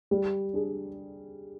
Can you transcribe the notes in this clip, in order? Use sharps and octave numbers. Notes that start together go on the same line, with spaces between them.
G3
D4 G#4